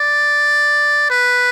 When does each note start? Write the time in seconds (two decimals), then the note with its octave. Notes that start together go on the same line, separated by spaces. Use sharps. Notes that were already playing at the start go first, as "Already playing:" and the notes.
Already playing: D5
1.10 B4